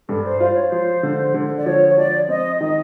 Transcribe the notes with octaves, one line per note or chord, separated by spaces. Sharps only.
G2 A4
C5
F4 C5
C#5
F3 C5
D3
D3
D5
F3 C#5
C#5
F3 D5
C4 D#5
D#3 D#5